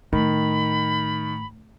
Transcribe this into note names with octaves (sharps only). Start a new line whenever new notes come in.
A2 D#3 B5